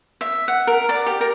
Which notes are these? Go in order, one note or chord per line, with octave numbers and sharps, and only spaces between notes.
E5
F#5
A#4
D5
G4
A#4